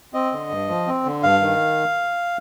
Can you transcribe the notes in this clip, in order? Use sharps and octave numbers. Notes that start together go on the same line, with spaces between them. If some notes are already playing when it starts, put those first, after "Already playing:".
C4 D#5
D3
G2
F3
C4
D3
G2 F5
D#3